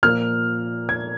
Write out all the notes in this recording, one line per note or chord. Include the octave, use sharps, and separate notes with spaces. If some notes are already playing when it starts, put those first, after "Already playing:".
A#2 F3 A#3 F6
G#6